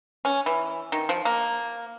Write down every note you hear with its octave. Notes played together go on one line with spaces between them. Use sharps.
C#4
E3
D#3
F3
A#3